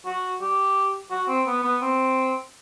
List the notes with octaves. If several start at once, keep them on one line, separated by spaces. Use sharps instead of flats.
F#4
G4
F#4
C4
B3
B3
C4